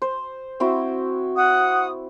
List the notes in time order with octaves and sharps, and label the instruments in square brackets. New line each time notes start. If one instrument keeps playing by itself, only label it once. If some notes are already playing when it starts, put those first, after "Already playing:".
[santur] C5
C4 E4 F#4
[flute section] F#5 D#6